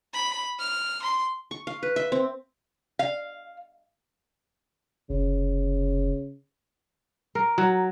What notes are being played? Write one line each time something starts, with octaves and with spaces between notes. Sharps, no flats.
B5
F6
C6
C#6
F5
B4
E5
C4
F5
F1 C#3
A#4
F#3